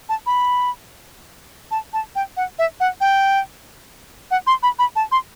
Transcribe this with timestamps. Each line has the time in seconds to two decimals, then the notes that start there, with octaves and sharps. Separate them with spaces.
0.09 A5
0.26 B5
1.71 A5
1.93 A5
2.16 G5
2.37 F#5
2.59 E5
2.80 F#5
3.01 G5
4.31 F#5
4.47 C6
4.63 B5
4.79 B5
4.96 A5
5.12 C6